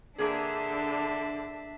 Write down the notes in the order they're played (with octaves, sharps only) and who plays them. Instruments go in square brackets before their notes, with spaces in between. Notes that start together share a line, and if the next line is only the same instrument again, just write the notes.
[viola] D3 [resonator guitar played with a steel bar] A#3 G#4 [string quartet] D4 E5